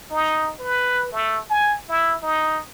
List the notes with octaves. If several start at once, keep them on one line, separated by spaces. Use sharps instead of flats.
D#4
B4
A3
G#5
E4
D#4